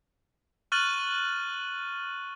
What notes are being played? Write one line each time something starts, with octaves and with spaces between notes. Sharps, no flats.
C#6 F6 F#6 A6 D#7 F#7